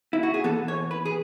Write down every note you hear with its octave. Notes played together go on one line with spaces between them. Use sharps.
E4
F#4
G#4
E3 B3 A4
C#5
B4
G#4